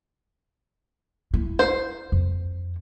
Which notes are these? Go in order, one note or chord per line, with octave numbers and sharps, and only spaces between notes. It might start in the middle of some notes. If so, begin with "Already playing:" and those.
E4
C5
F2